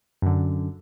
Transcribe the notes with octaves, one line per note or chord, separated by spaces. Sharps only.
F#2 D3